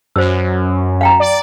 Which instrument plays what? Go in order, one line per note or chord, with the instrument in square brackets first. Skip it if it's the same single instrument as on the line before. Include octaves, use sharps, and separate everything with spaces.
[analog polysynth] F#2 [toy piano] C5 D5 E6
[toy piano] F5 G5 A#5
[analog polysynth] D5